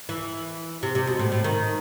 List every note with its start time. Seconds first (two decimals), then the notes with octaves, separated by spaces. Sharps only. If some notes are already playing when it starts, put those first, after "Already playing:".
0.09 E3
0.83 C3
0.95 C3
1.07 B2
1.19 A2
1.32 A2
1.44 D#3